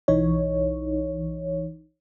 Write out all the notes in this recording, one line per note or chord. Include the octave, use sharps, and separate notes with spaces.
B1 E3 D#4 C#5